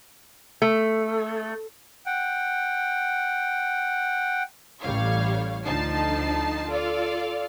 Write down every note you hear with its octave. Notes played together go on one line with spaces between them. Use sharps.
A3
F#5 G5
A1 G3 C#5 F5
D2 D3 F3 D#4 A5 C7
F4 A4 D5 F5